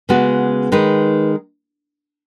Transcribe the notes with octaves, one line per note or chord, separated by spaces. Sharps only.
C#3 G#3 B3 F#4
D#3 G#3 D#4 B4